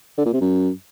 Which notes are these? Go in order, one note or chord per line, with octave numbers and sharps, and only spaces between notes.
D3
A#2
C3
F#2